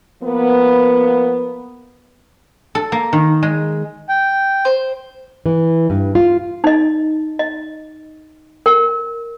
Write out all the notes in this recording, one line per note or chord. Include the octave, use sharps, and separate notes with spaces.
F3 A#3 B3
A4
A#3
D#3
G#3
G5
C5
E3
G2
F4
D#4 D#5
D#5
A#4